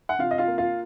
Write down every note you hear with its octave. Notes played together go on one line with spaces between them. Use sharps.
F#5
C3 F4 F5
D#5
F4 F5
A#3
F4 F5